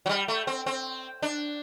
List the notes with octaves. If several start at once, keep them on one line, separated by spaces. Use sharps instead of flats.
F#3
G3
A3
C4
C4
D4